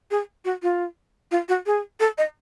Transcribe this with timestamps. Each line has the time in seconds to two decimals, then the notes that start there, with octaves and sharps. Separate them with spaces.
0.11 G#4
0.45 F#4
0.63 F4
1.31 F4
1.49 F#4
1.66 G#4
2.00 A4
2.18 D#5